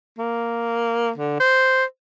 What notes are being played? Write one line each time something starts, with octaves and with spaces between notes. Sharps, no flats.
A#3
D3
C5